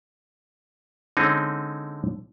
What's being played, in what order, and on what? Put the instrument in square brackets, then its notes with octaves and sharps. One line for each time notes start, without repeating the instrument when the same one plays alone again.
[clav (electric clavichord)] D3 G#3 C4 C#4 D#4